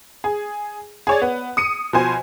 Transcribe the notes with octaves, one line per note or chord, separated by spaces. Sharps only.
G#4
G#4 C#5 D5
B3
D#6 C#7 D#7
B2 F3 C5 G#5